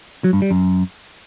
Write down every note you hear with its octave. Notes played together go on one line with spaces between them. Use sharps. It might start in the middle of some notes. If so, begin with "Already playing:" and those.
F#3
G2
G3
F#2